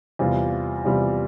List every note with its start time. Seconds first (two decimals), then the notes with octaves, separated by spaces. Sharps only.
0.19 E2 C3 G3 C4 F4
0.85 E2 C3 G3 C4 F4